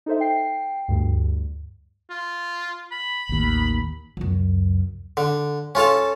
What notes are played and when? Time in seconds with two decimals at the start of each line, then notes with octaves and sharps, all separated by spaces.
0.06 D#4 A4 C5 E5
0.20 G5 C7
0.88 D2 G2
2.10 F4
2.92 B5
3.29 A1 D#2
4.17 C#2 F#2
5.17 D3
5.75 C#4 F4 A4 F5